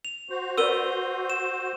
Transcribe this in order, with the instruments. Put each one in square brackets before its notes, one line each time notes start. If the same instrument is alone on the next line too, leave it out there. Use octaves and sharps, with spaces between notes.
[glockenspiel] F7
[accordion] F#4 C5
[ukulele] A#4 B4 D5 [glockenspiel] E6 D#7 G7
[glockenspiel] E7